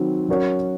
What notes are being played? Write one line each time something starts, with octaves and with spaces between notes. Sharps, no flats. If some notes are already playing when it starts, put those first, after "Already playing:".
Already playing: D#3 F#3 C4 F#4
F#3 C#4 F#4 A#4 C#5